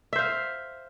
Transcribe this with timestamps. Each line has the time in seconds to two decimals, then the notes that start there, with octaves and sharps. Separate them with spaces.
0.13 E5
0.16 C5
0.19 F5